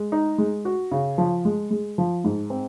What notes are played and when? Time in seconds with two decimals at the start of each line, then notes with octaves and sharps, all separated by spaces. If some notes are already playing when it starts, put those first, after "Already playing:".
Already playing: G#3
0.12 D#4
0.38 G#3
0.65 F#4
0.91 C#3
1.18 F3
1.45 G#3
1.71 G#3
1.98 F3
2.24 G#2
2.50 C4